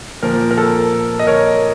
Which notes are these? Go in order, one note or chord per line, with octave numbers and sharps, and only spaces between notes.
A#2 F3 A#3 A#4
A#4
A4
D#5
A#4 C#5